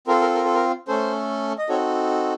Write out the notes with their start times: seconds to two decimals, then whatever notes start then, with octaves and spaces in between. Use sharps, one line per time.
0.07 C4 F4 A4 A#4
0.21 A#4
0.35 A#4
0.44 A4
0.54 A#4
0.88 A3 C#4 A4 C5
1.58 D#5
1.69 C4 D#4 F#4 A4 C#5